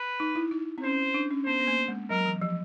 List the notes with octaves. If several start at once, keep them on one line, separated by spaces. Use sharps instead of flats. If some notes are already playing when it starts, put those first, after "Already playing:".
Already playing: B4
D#4
E4
D#4
C4
C#4 C5
D4
C#4
B3 C5
B3
A#3
G#3
F#3 A#4
E3
F3